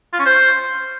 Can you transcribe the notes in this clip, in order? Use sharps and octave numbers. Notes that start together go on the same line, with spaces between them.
F4
C#4
C5